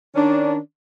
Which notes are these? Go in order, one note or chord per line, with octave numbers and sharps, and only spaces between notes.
D#3 C#4 D4